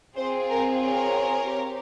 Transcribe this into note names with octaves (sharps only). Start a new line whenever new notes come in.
C4 F4 G#4 C5
A#4
A#4 C#5
C4 G4